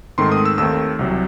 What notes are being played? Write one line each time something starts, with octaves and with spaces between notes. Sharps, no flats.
G#2 D#3 A3 C4 C6
D#6
E6
D#2 D#3 A3 C4 E6
C2 C3 F#3